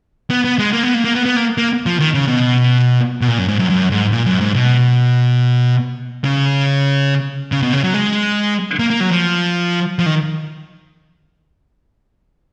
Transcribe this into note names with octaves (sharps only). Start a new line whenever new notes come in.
B3
B3
G#3
A#3
B3
A#3
A#3
B3
B3
A#3
A#3
F3
D#3
C#3
B2
B2
A#2
F#2
G#2
F#2
F#2
G#2
A#2
F#2
G#2
B2
C#3
C#3
B2
C#3
F#3
G#3
A#3
A#3
F#3
F3
F3
D#3